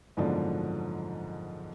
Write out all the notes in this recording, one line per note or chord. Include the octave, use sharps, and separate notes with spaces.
F#1 G#2 B2 D3 F3 D5